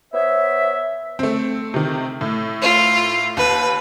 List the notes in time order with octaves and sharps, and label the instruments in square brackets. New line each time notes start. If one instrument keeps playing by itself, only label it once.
[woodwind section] B3 C5 C#5 E5
[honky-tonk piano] A3 C4
C3 D#3
A2
[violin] F4
[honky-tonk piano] D#2 [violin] B4